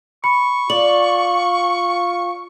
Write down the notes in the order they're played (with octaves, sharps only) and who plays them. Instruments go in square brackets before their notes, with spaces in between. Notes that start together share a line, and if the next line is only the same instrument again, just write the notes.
[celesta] B5 C#7 [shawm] C#6
[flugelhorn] F4 [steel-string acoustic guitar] D5 [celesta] F#7